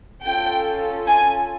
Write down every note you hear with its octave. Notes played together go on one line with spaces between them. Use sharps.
C#4 F4 A4 G5
G#5